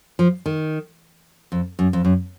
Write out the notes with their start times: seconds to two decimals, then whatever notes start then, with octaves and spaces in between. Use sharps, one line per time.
0.19 F3
0.46 D#3
1.52 F2
1.79 F#2
1.93 F2
2.05 F#2